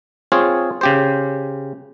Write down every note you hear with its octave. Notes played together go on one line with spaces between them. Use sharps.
C4 F4 G#4 C#5
C#3 G4 C5